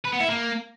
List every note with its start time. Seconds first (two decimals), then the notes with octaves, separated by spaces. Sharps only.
0.05 B4
0.13 B3
0.21 E4
0.28 A#3